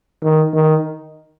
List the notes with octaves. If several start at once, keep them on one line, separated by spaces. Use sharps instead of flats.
D#3
D#3